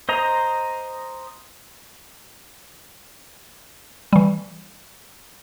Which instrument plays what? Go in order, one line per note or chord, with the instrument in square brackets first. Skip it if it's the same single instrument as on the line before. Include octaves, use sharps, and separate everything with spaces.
[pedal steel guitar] C5 D#5 A#5
[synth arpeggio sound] E3 G3